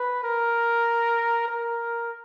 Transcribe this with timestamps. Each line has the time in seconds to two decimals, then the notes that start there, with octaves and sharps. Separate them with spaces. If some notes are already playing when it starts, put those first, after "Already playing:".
Already playing: B4
0.24 A#4
1.48 A#4